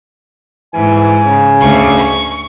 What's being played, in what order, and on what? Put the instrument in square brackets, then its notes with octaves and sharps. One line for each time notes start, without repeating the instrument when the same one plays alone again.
[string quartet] G#2 [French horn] E3 [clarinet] G#5
[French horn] C#3
[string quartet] D2 C#6
C#6